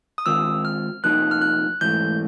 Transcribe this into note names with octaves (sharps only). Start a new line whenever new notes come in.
D#6
D#3 G#3 C4 F4 E6
F6
C3 F3 A#3 D#4 F#6
F6
F#6
G#2 E3 A3 G6